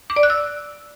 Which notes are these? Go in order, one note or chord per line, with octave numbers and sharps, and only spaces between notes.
D6
D5
F#6
E6